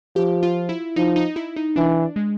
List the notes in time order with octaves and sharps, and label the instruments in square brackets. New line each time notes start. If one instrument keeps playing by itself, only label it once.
[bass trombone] F3 [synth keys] G4
[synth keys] F4
E4
[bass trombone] F3 [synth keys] D#4
[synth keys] D#4
E4
D#4
[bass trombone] E3 [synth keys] D4
[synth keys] G#3